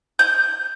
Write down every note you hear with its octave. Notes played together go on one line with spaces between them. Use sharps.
G6